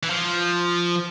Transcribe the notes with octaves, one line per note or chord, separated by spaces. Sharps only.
E3
F3